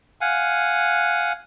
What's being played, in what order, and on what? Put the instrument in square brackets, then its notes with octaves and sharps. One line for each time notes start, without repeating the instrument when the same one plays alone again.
[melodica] F5 F#5 G#5